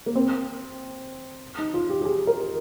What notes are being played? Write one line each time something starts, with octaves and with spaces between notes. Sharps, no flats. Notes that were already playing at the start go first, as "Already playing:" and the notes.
A#3
C4
D#4
F4
G4
G4
G#4
A#4